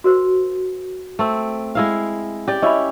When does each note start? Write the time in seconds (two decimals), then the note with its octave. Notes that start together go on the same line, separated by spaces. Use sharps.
0.04 F#4 A#4 C5
1.19 A3 C4
1.75 G#3 E4 F5
2.48 C#4 G4 D5
2.62 C#4 E4 D#5 E5 B5